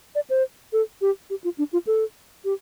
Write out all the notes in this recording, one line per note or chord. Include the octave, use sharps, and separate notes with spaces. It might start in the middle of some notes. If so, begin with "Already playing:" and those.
D5
C5
A4
G4
G4
F4
D4
F4
A4
G4